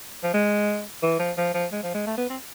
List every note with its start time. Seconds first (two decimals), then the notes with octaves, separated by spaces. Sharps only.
0.23 F3
0.34 G#3
1.03 E3
1.19 F3
1.38 F3
1.54 F3
1.72 G#3
1.83 F3
1.94 G#3
2.07 A3
2.17 B3
2.29 C4